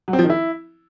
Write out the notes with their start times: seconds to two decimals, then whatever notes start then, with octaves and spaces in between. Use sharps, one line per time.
0.08 F#3
0.13 C4
0.19 F3
0.24 D#3
0.30 E4